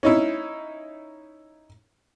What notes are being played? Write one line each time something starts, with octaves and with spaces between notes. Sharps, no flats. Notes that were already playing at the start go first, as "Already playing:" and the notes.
C#4 D#4 E4